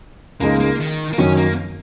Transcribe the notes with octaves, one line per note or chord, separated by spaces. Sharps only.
C#2 C#3 G#3 A#3 D#4
A#3
D#3
A#3
F#2 D#3 F#3 C#4
A#3